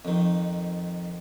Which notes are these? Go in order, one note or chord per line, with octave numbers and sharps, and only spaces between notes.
F2 D#3